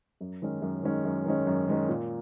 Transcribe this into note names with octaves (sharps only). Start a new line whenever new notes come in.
F#2
D#3 G#3 C#4
F#2
D#3 G#3 C#4
F#2
D#3 G#3 C#4
F#2
D#3 G#3 C#4
A#2